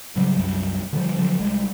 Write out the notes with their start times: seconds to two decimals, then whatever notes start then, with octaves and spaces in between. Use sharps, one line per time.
0.16 G#2 C#3 F#3 G3
0.37 C2 F#2 G3
0.93 D3 E3 F3 G3
1.19 D3 F3 F#3
1.40 C2 G3 G#3